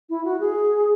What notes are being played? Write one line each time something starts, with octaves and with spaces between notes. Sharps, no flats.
E4
F#4
G#4